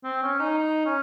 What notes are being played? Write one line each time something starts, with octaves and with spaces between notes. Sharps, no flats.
C4
C#4
D#4
D#4
C#4